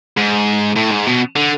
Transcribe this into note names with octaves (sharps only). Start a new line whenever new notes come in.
G#2
A2
G#2
B2
D3